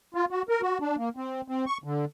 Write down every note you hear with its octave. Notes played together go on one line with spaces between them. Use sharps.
F4
F#4
A#4
F#4
D4
A#3
C4
C4
C#6
D3